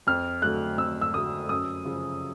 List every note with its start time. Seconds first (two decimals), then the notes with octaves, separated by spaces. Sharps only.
0.07 F2 F6
0.42 D3 F#3 A3 F#6
0.78 F2 E6
1.01 E6
1.14 D3 F#3 A3 D#6
1.49 F#2 D#6
1.85 C#3 F3